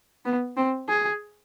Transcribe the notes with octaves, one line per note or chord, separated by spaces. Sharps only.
B3
C4
G#4